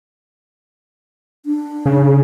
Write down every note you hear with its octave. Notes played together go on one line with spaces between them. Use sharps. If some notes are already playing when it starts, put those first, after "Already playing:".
D4
C#3